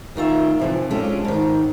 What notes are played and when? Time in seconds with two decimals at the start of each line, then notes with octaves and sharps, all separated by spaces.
0.15 D2 D#3 F4 E5
0.59 C3 E3 F3
0.91 G#3 C#4 D4 F4 G4 A4
1.25 G#2 D#3